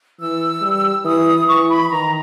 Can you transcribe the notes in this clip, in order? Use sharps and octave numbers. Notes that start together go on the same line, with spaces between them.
E3 E6
G3
E3 D#6
E3 C#6
B5
D#3 A#5